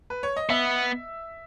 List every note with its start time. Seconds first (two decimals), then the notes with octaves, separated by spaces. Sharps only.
0.10 B4
0.23 C#5
0.37 D#5
0.49 B3 E5